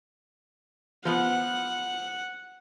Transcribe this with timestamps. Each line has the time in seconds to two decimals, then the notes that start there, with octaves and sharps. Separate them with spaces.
1.05 F3 B3 F#5